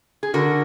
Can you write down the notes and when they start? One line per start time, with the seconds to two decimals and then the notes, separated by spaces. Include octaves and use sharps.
0.23 G#4
0.34 D3 F#4 A#4